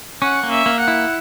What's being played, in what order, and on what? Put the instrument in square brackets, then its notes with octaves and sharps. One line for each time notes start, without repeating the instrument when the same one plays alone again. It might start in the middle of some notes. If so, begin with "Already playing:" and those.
[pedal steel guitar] C#4 [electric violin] F#5
[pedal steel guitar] A#3
[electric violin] E5
[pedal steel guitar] A#3
[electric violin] F#5
[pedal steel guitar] E4